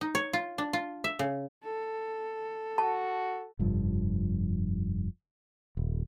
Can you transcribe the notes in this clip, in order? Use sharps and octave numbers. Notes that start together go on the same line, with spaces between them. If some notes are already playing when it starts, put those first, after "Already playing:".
D#4
C#5
F4
D4
F4
E5
C#3
A4
F#4 A5
F1 G2 F3
D#1